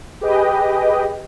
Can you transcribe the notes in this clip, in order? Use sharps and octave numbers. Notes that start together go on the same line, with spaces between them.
G4 G#4 B4 D#5 G5